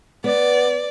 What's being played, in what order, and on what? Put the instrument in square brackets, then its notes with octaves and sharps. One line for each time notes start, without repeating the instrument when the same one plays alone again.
[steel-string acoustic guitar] B3 [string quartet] D5